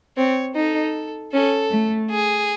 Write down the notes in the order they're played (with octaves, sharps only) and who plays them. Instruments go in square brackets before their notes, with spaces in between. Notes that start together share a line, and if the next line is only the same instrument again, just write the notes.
[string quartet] C4 [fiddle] C#5
[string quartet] D#4 [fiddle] A4
[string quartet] C#4 [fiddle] A4
[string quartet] A3
[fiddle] G#4